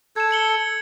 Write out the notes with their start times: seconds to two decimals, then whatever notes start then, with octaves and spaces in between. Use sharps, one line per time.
0.16 A4 G#6 E7
0.31 C#7 F#7 G7